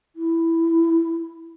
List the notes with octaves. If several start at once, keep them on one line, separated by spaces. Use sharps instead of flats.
E4